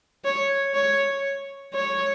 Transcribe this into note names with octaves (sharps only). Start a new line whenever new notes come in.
C#5
C#5
C#5